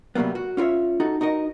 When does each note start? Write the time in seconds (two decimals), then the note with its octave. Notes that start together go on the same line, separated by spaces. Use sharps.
0.15 C3 F#3 G3 A#3 B3
0.35 F#4
0.57 C#4 F4 A#4 C#5 E5
1.00 D#4 F#4 A4
1.21 D#4 F#4 A#4 D#5